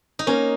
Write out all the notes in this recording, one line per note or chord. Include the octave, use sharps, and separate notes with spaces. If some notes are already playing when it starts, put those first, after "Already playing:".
D#4
A#3 C#4